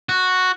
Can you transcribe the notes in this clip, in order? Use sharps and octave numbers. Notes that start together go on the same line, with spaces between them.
F#4